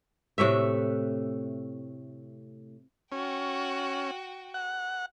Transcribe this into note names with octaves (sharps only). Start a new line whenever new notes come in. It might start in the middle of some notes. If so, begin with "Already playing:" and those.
A2 C3 A3 E5
C#4 F#4 G5
F#5